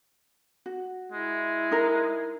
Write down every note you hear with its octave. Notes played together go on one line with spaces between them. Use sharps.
F#4
G#3 E4
D#4 A#4